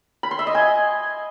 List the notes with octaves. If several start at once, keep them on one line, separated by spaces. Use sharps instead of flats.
B5
C6
E5
D#5
G#5